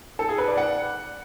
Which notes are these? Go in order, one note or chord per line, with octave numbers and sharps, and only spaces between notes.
A4
G#4
B4
D5
F#5